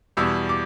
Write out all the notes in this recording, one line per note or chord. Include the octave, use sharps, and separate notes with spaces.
E2 B2 G3 E6
D6